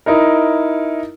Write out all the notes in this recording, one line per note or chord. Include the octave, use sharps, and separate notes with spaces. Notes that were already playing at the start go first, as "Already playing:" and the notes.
D#4 E4 A#4